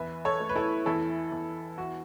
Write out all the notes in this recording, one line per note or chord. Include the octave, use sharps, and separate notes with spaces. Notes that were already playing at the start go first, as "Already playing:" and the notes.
Already playing: E2 B4 E5
A4 C#5
A3
B4
E4 A4
E2 E4 A4
E2
E3 F#4